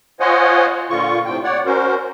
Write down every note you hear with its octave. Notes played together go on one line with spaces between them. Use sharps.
F4 C5 C#5 D#5 F#5 G#5
A#2 D3 F4 C#6
A2 C3 G5
C#5 D5 F#5
C#4 F#4 A#4 C5